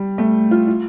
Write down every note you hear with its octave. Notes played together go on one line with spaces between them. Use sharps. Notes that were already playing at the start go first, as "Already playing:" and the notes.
Already playing: G3
A3
F4
F4